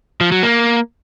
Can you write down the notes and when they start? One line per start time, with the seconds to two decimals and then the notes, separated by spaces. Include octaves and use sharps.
0.21 F3
0.32 F#3
0.43 A#3